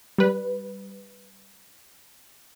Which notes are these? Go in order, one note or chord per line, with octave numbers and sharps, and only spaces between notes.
G3 B4